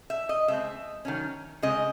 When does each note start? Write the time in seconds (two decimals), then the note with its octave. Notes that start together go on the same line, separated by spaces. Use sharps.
0.10 E5
0.29 D#5
0.48 C#3 G#3 C4 E5
1.05 D#3 F#3 C#4
1.62 C#3 G#3 C4 D#5